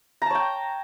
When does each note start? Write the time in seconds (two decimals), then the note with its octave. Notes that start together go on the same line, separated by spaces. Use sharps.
0.22 A#5
0.26 A5
0.30 C#5
0.35 G5